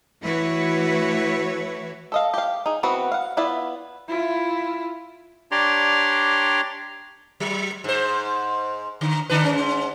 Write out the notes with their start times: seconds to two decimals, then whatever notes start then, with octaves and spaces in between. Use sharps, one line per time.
0.22 E3 A3 E4 F#4 B4 C#5
2.12 A4 D#5 F5
2.34 G4 F5
2.66 D#4 G#4
2.83 E3 B3 C4 F#4 B4
3.12 F5 F#5
3.37 B3 E4 F4 D5
4.08 E4 F4
5.51 D4 G4 C#5 D5 A#5 C6
7.40 F#3
7.84 G#2 C5
9.01 D3
9.30 D3 D4 B4
9.43 G#2 C#4